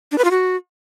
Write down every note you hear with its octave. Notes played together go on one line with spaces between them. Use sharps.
D4
B4
F4
F#4